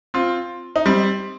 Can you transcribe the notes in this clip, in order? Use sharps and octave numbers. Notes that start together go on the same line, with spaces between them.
C4 F4
D#4
G3 C4